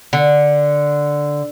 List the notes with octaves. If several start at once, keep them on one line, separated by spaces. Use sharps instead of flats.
D3